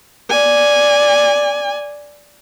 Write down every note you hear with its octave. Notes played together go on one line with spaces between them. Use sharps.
D5 G#5